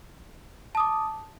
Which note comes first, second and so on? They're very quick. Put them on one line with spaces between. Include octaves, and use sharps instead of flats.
A5 D#6 D6